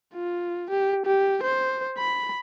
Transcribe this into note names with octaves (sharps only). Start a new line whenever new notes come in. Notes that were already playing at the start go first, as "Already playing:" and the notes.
F4
G4
G4
C5
B5